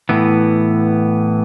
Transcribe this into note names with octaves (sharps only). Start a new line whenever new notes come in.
A2 E3 B3